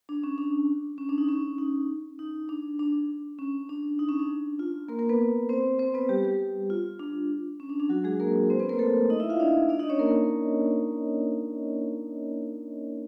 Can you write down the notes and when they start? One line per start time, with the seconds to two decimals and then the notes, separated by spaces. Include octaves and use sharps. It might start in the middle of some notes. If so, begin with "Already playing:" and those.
0.09 D4
0.24 C#4
0.38 D4
0.98 C#4
1.09 D4
1.18 D#4
1.29 C#4
1.58 D#4
2.19 D#4
2.49 D4
2.79 D4
3.39 C#4
3.69 D4
3.99 D#4
4.09 C#4
4.19 D4
4.59 F4
4.88 A#3 A#4
4.99 A#3 A#4
5.09 B3 B4
5.49 C4 C5
5.79 C4 C5
5.94 B3 B4
6.09 G3 G4
6.24 G3 G4
6.70 F4
6.99 D4
7.60 C#4
7.69 D4
7.80 D4
7.89 F#3 F#4
8.04 G#3 G#4
8.20 A#3 A#4
8.50 C4 C5
8.60 B3 B4
8.69 A#3 A#4
8.79 A3 A4
9.10 D#4 D#5
9.20 E4 E5
9.29 F4 F5
9.40 D4 D5
9.69 D4 D5
9.79 D#4 D#5
9.89 C#4 C#5
9.99 A#3 A#4